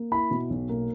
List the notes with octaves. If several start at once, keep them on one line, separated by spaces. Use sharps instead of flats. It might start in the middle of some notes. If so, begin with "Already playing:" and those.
Already playing: A#3
E4 B5
B2
B1
A#3